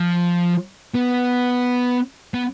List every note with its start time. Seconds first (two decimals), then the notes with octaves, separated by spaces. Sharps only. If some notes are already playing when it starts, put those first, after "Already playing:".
Already playing: F3
0.95 B3
2.34 B3